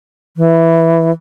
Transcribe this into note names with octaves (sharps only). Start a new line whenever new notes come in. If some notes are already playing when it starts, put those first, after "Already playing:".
E3